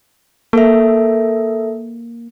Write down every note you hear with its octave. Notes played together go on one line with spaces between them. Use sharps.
A#3 A4 A#4 E5